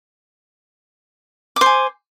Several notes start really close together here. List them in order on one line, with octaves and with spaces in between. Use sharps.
D6 C5 G#5